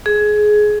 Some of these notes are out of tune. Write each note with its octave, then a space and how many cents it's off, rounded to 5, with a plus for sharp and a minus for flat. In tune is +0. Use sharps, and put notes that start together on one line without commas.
G#4 +20